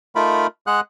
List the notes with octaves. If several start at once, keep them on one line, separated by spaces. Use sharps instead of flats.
A3 D#4 F4 A#4 B5
G#3 G#4 F#5 F#6